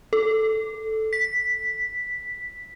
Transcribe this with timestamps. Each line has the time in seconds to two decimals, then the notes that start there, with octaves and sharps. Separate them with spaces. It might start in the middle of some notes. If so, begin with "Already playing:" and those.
0.13 A4
1.13 B6